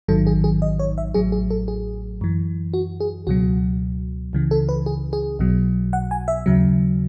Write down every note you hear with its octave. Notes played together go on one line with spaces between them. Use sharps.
A1 G#2 D#3 F#3 A4
G#4
G#4
D#5
C#5
E5
A1 A2 F#3 G#4
G#4
A4
G#4
F#2 E3
F#4
G#4
C#2 B2 F#3 F#4
C#2 C#3 E3
A4
B4
G#4
G#4
B1 B2 F#3
F#5
G#5
E5
D#2 C#3 F#3